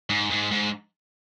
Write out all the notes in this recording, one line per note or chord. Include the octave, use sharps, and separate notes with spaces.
G#2
G#2
G#2